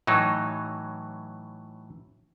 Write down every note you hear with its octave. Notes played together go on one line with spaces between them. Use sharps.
A2 E3 F#3 D#4